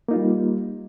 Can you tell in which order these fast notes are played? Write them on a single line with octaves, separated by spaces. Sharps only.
A#3 D#4 F4 G3